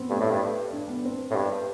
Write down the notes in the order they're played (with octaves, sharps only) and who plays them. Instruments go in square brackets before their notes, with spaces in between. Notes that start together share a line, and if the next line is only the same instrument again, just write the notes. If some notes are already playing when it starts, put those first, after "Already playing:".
Already playing: [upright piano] B3 C4
[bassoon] G2 [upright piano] A3
[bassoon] A2
G2
[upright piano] D4
B3
C4
[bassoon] A2
G2